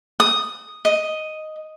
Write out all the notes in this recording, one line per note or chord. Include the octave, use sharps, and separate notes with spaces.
D#6
D#5